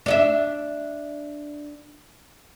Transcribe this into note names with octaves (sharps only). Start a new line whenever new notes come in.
D4 D#5 E5